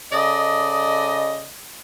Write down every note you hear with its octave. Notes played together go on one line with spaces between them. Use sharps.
C#3 A4 D5 D#5